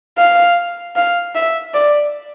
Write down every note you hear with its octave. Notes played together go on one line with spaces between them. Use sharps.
F5
F5
E5
D5